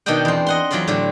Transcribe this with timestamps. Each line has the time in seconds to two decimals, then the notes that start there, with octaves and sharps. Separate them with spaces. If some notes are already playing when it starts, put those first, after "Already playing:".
0.06 B2 D#3 D4 D#5 F#5 G5
0.25 E2 C4
0.46 D#5 F#5 C6
0.71 E2 F#3 F4 D5 B5 C6
0.87 A2 D3 F#3 G4